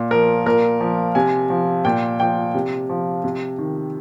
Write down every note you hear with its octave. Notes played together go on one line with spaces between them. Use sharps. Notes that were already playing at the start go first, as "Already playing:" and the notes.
Already playing: A#2
F3 A#4
A#2 A#4
F3
C3 G#5
F3
A#2 G5
F3 G5
C3
F3
C3
D#3